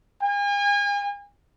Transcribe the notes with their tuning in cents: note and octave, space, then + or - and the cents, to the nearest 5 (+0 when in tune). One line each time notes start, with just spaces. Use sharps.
G#5 -40